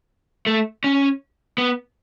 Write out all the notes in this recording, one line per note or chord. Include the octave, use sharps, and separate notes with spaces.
A3
C#4
B3